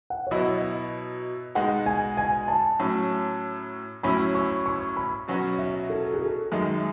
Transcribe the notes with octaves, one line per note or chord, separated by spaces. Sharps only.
F#5
C#5
B2 F#3 B3 E4 D#5
D#5
B2 G#3 D#4 F#4 F#5
G#5
G#5
A5
A2 F#3 C#4
A2 F#3 C#4 E4 B5
C#6
C#6
B5
B2 F#3 C#4 F#4
E5
A4
G#4
A4
F#2 D#3 G#3 E5